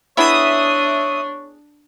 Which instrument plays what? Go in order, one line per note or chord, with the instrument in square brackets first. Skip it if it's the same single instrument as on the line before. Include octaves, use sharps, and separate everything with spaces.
[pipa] B3 E4 G#4 [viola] D4 [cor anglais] C#5 [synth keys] E5 D#6